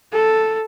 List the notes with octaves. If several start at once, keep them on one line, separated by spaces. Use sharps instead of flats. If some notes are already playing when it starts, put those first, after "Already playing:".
A4